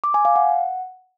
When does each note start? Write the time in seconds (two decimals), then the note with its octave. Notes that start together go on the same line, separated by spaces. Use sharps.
0.04 D6
0.14 G#5
0.25 F5
0.36 F#5